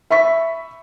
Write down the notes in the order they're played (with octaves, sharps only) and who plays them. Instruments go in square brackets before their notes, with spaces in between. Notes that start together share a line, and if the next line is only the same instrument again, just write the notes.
[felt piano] E5 B5 C#6 B6